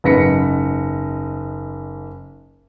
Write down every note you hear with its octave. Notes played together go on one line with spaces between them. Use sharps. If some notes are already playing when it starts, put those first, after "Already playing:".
F#1 G#2 B4 A#6 B6 C#7